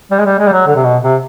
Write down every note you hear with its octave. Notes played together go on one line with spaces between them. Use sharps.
G3
G#3
G3
G#3
G3
F#3
D3
C3
B2
C3